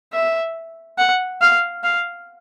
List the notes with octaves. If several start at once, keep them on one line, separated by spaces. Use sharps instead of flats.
E5
F#5
F5
F5